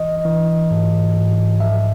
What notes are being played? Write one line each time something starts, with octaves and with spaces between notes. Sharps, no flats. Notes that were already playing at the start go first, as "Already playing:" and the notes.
Already playing: E3 D#5
E3
G#2
G#2
F3 E5